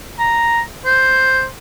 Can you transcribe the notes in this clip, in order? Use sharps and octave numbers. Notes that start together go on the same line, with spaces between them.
A#5
C5